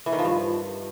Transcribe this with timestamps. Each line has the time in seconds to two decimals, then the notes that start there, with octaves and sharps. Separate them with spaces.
0.06 E3
0.12 D#3
0.19 F3
0.25 G2